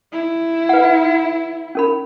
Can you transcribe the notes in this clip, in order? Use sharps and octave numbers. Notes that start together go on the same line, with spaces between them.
E4
B4 F#5
C#4 A#4 B5